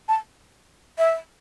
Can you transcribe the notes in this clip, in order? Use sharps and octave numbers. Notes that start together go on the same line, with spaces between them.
A5
E5